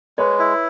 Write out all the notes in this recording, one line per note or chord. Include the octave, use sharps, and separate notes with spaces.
G#3 B4 C#5
E4